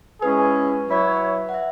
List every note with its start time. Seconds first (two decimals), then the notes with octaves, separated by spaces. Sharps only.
0.22 G#3 C#4 E4 G#4 B4
0.88 F#3 E4 C#5
1.49 F#5
1.54 E5